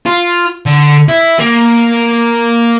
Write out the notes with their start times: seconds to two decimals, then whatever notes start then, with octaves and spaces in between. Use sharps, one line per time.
0.06 F4
0.66 D3
1.08 E4
1.39 A#3